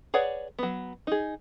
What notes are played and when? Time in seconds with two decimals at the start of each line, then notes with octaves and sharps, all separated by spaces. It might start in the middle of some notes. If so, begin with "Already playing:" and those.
0.14 G#4 B4 C#5 D5 F#5
0.59 F#3 B3
1.07 D#4 G#4